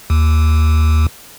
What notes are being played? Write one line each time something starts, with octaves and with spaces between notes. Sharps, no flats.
D#2